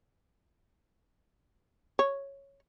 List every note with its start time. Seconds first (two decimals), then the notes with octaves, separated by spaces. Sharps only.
1.99 C#5